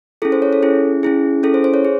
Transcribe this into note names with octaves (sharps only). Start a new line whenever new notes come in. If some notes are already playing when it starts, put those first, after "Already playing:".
C#4 E4 G#4 A4
C5
C#5
A4
C#4 E4 G#4
C#4 E4 G#4
C#4 E4 G#4 A4
C5
C5
C#5
G#4